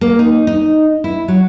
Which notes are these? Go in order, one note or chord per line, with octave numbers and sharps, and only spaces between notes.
A#3
D#4
D#4
E4
F#3